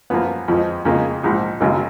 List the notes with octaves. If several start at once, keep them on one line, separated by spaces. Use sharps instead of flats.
F#2 F3 A#3 B3
F2 F3 G#3
F2 C#3 G#3 A#3
A#1 G#2 F3
G#1 F#2 C#3 F#3 A#3